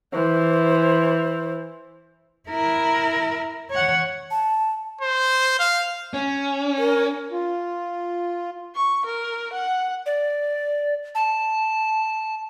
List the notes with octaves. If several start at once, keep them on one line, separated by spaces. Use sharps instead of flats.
E3 C5
E4 A#4
C#5 F#5
A5
C5
F5
C#4
A#4
F4
C#6
A#4
F#5
D5
A5